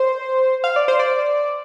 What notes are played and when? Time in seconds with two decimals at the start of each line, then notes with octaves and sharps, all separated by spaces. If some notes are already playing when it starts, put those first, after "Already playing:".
Already playing: C5
0.64 F5
0.76 D5
0.88 C5
0.99 D5